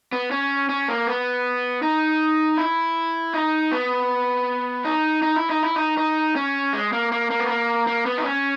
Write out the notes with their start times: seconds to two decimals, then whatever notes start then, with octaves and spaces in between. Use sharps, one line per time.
0.13 B3
0.31 C#4
0.69 C#4
0.88 A#3
1.07 B3
1.83 D#4
2.58 E4
3.34 D#4
3.72 B3
4.85 D#4
5.22 D#4
5.36 E4
5.50 D#4
5.63 E4
5.76 D#4
5.98 D#4
6.36 C#4
6.73 G#3
6.93 A#3
7.12 A#3
7.30 A#3
7.40 B3
7.49 A#3
7.87 A#3
8.06 B3
8.18 D#4
8.24 C#4